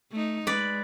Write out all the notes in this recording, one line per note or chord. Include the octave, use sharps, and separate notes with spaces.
A3 D#4
G#3 B4 D5